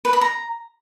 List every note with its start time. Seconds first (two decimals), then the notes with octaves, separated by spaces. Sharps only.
0.05 B4
0.13 B5
0.21 A#5